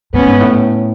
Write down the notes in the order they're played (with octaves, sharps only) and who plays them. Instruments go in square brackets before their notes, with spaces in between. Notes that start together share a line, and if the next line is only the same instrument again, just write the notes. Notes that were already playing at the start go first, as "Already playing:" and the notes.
[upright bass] A2 [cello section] B3 C#4
[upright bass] G#2
A2